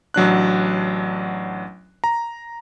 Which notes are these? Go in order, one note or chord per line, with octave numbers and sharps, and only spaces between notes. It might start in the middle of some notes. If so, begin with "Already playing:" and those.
A1 F#3 D4 F#6
A#5